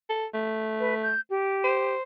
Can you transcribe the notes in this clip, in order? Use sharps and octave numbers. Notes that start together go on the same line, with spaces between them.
A4
A3
B4
G6
G4
C5